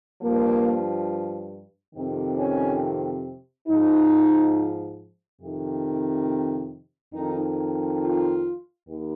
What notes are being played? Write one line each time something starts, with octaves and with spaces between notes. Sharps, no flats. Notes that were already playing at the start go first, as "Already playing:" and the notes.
G2 F3 A#3
F2 C3 D#3 C4
C#4
G#2 F3 D#4
F2 C3 D#3
F2 D#3 D#4
F4
D#2